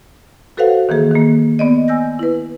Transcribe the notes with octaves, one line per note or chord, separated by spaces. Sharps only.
F#4 A4 B4 C5 F5 F#5
D#3 E3 A#3 G#4
D#3 A#3
B3 D5 D#5
G#5 E6 G6 A#6
E4 B4